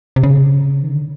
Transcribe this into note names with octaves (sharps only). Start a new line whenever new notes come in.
C3
C#3
D#3
D3